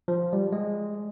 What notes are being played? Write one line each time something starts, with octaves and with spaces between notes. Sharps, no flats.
F3
G3
G#3